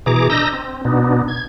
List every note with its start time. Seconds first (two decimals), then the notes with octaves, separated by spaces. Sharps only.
0.06 B2 E3 G#4 A#5 D6
0.30 D4 D#5 A#5 E6 G6 A#6
0.53 C4
0.85 B2 B3 D4 D#4
1.28 G#6